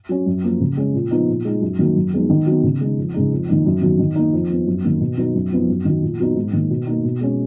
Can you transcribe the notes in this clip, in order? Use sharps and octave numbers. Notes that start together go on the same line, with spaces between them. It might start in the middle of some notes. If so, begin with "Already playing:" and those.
F#3 C#4
F#2
F3 A#3
C#3
G#3 C#4
A#2
F3 B3 D#4
A#2
G#3 D#4
F#2
D#3 F#3 A#3
F#2
F3 G#3 B3 D#4
D#3
F#3 B3
C#3
G#3 D#4
F2
C#3 G#3 D#4
F2
D#3 A#3 D#4
F#2
D#3 F#3 B3
D#3
A#3 D#4
F2
F3 B3
F#2
D#3 A#3
B2
F#3 B3 D#4
F#2
F3 B3 D#4
F#2
D#3 F#3
A#2
F#3 B3 D#4
G#2
D#3 A#3
B2
A#3 D#4
B2
G#3 C#4